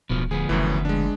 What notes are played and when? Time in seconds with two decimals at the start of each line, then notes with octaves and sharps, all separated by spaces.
0.10 D1 B1 B2 F3
0.31 D2 F3 B3 G#4
0.49 F#1 F#2 A2 E3
0.85 G#3 D4